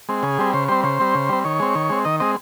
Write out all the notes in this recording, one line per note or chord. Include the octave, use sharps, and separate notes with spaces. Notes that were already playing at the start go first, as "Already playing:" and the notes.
G#3 C4
C#3 G#4
G3 C4
C#3 C5
G3 C4 C5
C#3 C5
G3 C4
C#3
G3 C4
D#3 C#5
G#3 C4
D#3
G#3 C4
D#3 D#5
G#3 C4 D#5